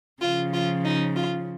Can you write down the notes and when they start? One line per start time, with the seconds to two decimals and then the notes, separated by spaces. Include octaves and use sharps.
0.21 C#3 F3 F4
0.53 F4
0.85 D#4
1.16 F4